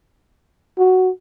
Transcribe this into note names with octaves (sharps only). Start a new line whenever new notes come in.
F#4